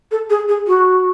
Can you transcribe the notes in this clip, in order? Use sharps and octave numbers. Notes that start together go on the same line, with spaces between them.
A4
G#4
G#4
F#4